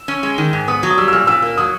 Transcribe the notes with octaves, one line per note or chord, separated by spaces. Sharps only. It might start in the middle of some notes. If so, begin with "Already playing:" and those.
Already playing: E6
C#4
G#3
D#3
G#2
B3 D#6
F#3
D#6
G3 E6
E6
A#2 F6
A#2 E6
A#3
F#3 D#6